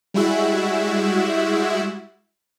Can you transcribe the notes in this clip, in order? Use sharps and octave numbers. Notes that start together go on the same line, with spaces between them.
G3 G#3 E4 F#4 E5